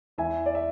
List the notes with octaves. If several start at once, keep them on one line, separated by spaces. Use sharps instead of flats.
E2 E5 G#5
D5
E5